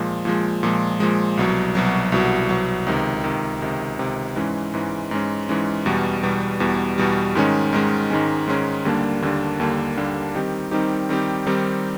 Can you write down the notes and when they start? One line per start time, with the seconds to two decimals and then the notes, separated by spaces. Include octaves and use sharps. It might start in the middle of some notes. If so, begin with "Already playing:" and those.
Already playing: A#2 F3 G#3
0.25 A#2 F3 G#3
0.63 A#2 F3 G#3
1.00 A#2 F3 G#3
1.37 C2 B2 F#3
1.75 C2 B2 F#3
2.12 C2 B2 F#3
2.49 C2 B2 F#3
2.87 C#2 C3 D#3
3.24 C#2 C3 D#3
3.62 C#2 C3 D#3
3.99 C#2 C3 D#3
4.36 G#2 E3 G#3 C#4
4.74 G#2 E3 G#3 C#4
5.11 G#2 E3 G#3 C#4
5.49 G#2 E3 G#3 C#4
5.86 E2 B2 G3
6.23 E2 B2 G3
6.60 E2 B2 G3
6.98 E2 B2 G3
7.35 G#2 D#3 G#3 C#4
7.73 G#2 D#3 G#3 C#4
8.10 G#2 D#3 G#3 C#4
8.48 G#2 D#3 G#3 C#4
8.85 D#2 D3 G3 A#3 D4
9.22 D#2 D3 G3 A#3 D4
9.60 D#2 D3 G3 A#3 D4
9.97 D#2 D3 G3 A#3 D4
10.35 D#3 G3 C4 D#4 G4
10.71 D#3 G3 C4 D#4 G4
11.09 D#3 G3 C4 D#4 G4
11.46 D#3 G3 C4 D#4 G4